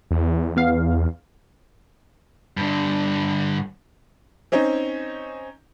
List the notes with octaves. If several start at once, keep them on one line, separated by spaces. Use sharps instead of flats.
E2
B3 F5
G2 D3
C4 C#4 D#4